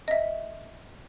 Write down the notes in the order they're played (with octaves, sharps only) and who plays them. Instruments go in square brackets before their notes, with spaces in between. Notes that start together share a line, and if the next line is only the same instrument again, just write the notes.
[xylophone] D#5 E5